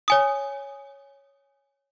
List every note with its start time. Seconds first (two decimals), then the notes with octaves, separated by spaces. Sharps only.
0.08 C#5 G#5 D#6